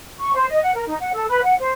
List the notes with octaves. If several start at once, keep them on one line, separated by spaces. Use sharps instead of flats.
C#6
C5
D#5
F#5
A#4
D#4
F#5
A4
B4
F#5
C5